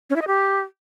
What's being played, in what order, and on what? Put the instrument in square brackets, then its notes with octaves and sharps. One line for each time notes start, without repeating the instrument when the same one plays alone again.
[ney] C#4
E4
D#5
G4